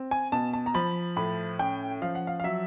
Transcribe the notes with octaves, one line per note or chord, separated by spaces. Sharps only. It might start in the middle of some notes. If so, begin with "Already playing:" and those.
Already playing: C4
G#5
B2 A5
A5
A#5
F3 B5
A2 B5
C#4 G5
F3 F5
F#5
F5
F5
F#3 E5